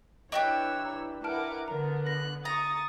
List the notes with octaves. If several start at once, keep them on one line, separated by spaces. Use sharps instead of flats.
E3 D4 F#4 G4 C#5 D#5 C#6 E6
A#5
E4 A#4 B4 F#5 A5 D6 F6 D7
D3 B3 A#4 A#5
F#6 A#6
A#5 C#6 D#6 A6